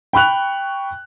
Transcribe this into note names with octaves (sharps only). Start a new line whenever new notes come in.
G5 B5 C#6 F#6 F7